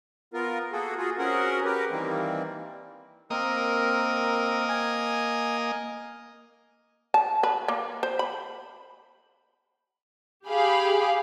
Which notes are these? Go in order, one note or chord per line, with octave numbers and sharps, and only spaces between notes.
B3 F4 A#4
A#3 F#4 G#4 A4
F4 F#4 G#4
C4 C#4 F#4 G#4 A#4 F#5
G4 A#4 B4
D#3 E3 G3 A#3 C4
A#3 C4 A#4 D#5
G#5
A5
B4
A#3
C5
B5
G4 G#4 F5 B5